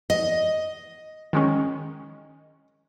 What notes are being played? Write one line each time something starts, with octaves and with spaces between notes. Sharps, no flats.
D#5
D#3 G#3 C#4